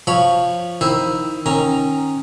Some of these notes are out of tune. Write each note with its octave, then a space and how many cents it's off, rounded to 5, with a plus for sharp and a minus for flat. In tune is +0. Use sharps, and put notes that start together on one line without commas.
F3 +0 C#5 +0 B5 -10
D#3 +10 E4 +0 C5 +15
D#3 +0 C#4 -20 A#5 +0